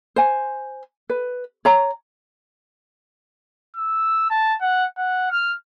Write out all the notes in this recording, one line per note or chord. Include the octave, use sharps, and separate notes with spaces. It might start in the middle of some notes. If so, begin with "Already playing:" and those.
C5 G#5
B4
C#5 A#5
E6
A5
F#5
F#5
F6